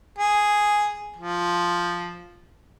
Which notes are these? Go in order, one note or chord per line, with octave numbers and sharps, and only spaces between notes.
G#4
F3